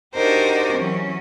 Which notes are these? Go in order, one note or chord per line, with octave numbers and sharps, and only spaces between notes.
D4 D#4 F#4 G4 A#4 C5
E3 F#3 C#4